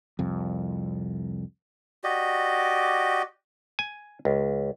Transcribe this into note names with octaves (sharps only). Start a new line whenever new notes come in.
C2 F2
F#4 G4 D5 D#5
G#5
C#2